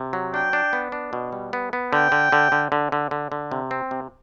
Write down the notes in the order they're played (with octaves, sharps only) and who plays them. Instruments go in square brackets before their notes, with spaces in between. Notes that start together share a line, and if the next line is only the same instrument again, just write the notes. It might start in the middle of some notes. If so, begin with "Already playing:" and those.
Already playing: [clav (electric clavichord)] C3
F#3
[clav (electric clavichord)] D4 [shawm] G5
[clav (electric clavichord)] D4
B3
D4
B2
G3
B3
B3
[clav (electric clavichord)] D3 [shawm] G5
[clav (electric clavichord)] D3
D3
D3
D3
D3
D3
D3
C3
C4
C3